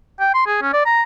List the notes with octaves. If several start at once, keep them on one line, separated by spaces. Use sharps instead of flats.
G5
C6
G#4
C#4
D5
A#5